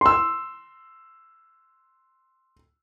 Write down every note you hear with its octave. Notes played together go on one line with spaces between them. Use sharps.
C6 E6